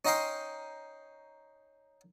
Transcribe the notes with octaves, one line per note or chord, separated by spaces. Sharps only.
C#4 D#4 D#5 F5 G5 C6